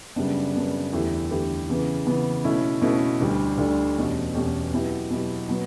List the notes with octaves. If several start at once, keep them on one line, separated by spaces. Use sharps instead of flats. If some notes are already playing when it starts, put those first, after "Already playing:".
F#2 C#3 G3 B3 D4
F#2 C#3 G3 B3 D4
E2 D3 A3 E4 G4
E2 D3 A3 E4 G4
C#3 E3 B3
C#3 E3 B3
B2 A3 C#4 E4
B2 A3 C#4 E4
D2 D3 G3 D4
D2 D3 G3 D4
E2 B2 A3 C#4 G4
E2 B2 A3 C#4 G4
B2 F#3 B3 E4 G4
B2 F#3 B3 E4 G4
B2 F#3 B3